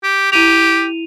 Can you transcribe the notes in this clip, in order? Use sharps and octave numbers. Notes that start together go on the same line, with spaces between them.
G4
E4 G4 D#7 F7